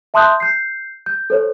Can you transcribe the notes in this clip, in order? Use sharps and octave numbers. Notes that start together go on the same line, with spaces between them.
E5 A5 C6 D#6 F#6 G6
G6 C7
G6
A4 C5 C#5